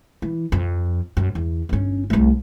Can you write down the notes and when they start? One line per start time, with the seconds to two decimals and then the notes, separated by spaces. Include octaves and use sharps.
0.22 E3
0.52 F2
1.17 F#2
1.35 E2
1.69 G1 C#4
2.10 C2 A3